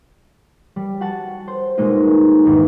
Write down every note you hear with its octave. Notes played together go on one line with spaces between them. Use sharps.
G3
F#4 F#5 A5
C5
B2 G3 G#3 A#3 D#4 F4
F1 E2 G#2 D#3 E3